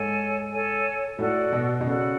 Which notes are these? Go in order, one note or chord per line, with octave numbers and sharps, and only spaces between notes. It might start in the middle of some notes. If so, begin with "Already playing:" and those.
Already playing: G#2 A4 C#5 G#5
A4 C#5 G#5
A2 F#4 A4 D5
B2
B2
C#3 F#4 A4 D5